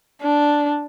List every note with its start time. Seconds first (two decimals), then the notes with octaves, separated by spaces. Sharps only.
0.22 D4